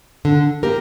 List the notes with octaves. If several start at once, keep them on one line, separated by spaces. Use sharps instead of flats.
D3
A#3 G4 A#4